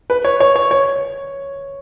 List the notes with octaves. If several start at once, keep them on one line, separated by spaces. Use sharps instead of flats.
B4
C#5
C#5
C#5
C#5